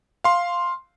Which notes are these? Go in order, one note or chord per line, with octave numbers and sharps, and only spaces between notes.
F5 C6